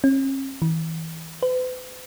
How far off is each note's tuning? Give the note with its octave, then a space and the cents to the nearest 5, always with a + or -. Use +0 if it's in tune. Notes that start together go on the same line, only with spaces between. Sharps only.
C#4 -45
E3 -30
B4 +45